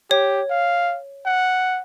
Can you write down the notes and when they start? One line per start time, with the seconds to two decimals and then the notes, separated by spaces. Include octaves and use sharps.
0.11 G4 C#5
0.51 F5
1.26 F#5